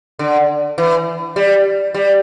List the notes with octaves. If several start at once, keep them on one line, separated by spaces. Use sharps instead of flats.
D3
E3
G3
G3